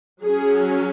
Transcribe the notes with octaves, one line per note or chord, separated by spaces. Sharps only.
F#3 C#4 G#4